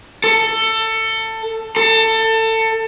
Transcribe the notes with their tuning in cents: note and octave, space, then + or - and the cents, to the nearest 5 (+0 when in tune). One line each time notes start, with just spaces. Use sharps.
A4 +20
A4 +25